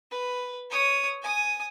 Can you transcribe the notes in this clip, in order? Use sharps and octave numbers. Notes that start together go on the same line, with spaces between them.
B4
C#5 D#6
G#5 D#6